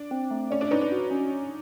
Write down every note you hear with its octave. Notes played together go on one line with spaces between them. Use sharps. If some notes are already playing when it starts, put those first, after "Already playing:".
Already playing: D4
C4
A3
C#4 D5
D4
C#4 D#4 B4
D4
F#4
C#4